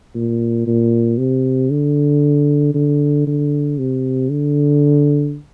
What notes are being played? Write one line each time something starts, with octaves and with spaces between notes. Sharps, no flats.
A#2
A#2
C3
D3
D3
D3
C3
D3